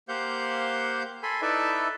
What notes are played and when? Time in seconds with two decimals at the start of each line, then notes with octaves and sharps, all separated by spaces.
0.08 A#3 G4 C5 F5 F#5 G6
1.23 A4 G#5 B5 C6
1.41 D#4 E4 A4 B4 D5 E5